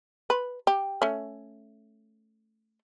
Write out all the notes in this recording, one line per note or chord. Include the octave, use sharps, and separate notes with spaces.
B4
G4
A3 C#4